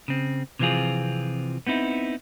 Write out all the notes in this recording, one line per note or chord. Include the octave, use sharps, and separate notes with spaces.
C#3 C4
C3 E3 F3 C4 F4 G#4
B3 C4 D#4 E4